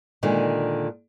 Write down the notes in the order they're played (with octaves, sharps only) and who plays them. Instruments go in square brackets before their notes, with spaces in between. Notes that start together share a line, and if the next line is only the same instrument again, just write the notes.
[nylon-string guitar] A#2 D3 D#3 G#3